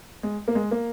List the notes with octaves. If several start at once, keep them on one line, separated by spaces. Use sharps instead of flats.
G#3
A#3
G#3
A#3